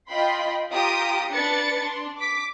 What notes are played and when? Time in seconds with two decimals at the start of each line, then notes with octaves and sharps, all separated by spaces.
0.11 F4 D#5 G5 B5 C6
0.72 F4 G4 G5 A#5 D#6 D7
1.33 D4 B4 A6 C#7
1.81 D4 C6
2.17 D6 B6